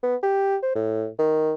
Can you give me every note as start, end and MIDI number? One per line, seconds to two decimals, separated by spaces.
0.03 0.16 59
0.23 0.56 67
0.63 0.72 72
0.75 1.08 45
1.19 1.54 51